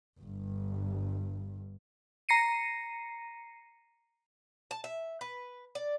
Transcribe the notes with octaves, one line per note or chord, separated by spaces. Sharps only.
G1 G2
A#5 A#6 C7 C#7 D#7
A5
E5
B4
D5